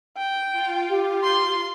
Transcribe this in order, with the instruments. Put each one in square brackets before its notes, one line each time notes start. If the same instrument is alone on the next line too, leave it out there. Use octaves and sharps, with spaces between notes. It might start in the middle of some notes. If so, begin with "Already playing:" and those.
[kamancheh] G5
[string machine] F4
[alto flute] G4
[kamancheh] C6